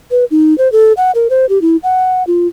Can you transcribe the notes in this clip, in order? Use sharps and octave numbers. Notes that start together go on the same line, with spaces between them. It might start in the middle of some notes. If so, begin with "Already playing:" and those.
B4
D#4
C5
A4
F#5
A#4
C5
G4
E4
F#5
F4